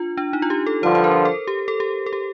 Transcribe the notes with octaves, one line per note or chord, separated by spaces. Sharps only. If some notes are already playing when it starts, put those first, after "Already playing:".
Already playing: D4 F4
D4
D#4
F4
G4
A4
G2 D3 F3 C5
C5
A#4
A4
G4
A4
G4
A4
G4